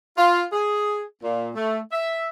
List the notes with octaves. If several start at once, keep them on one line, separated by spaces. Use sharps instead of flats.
F4
G#4
A#2
A3
E5